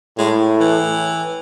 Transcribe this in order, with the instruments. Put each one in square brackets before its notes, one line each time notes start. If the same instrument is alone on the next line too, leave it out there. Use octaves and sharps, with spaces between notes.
[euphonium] A2 [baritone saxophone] G#3
[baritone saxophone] E3